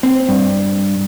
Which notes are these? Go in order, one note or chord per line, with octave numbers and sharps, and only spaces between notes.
C4
G2